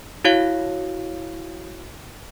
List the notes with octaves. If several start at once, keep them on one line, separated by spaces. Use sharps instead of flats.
E4 F#4 C#5 F5